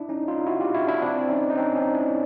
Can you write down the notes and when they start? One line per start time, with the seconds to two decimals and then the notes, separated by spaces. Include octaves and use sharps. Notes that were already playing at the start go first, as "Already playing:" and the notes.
Already playing: D4 E4
0.09 C#4 D#4
0.28 D#4 F4
0.46 E4 F#4
0.60 F4 G4
0.74 E4 F#4
0.88 D4 E4
1.02 C4 D4
1.29 C#4 D#4
1.50 D#4
1.57 C4 D4
1.76 C#4 D#4
1.94 D4 E4